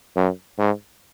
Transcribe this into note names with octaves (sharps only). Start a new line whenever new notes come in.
F#2
G#2